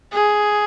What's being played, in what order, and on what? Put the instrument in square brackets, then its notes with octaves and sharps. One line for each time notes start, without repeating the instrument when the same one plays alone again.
[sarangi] G#4